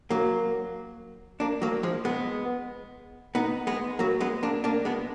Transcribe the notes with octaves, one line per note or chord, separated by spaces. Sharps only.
F#3 A#3
A#3 D4
F#3 A#3
F3 G#3
G#3 B3
B3 D#4
G#3 B3
F#3 A#3
G#3 B3
A#3 D4
A#3 D4
G#3 B3